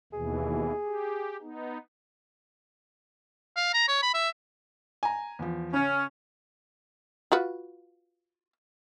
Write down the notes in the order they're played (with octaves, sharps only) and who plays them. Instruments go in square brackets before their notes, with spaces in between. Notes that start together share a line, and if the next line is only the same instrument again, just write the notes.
[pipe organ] D#2 B2 E3 [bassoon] G#4
[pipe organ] G4
B3 D#4
[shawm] F5
A#5
C#5
B5
E5
[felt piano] G#5 A#5
E2 F3
[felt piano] C#3 [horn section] C#4
[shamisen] F4 F#4 B4